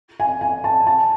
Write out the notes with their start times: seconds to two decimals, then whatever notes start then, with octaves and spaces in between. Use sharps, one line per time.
0.20 G#5
0.41 G#5
0.64 A5
0.87 A5